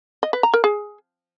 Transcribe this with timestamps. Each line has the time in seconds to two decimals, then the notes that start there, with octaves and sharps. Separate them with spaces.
0.23 D#5
0.33 B4
0.43 A#5
0.54 A#4
0.64 G#4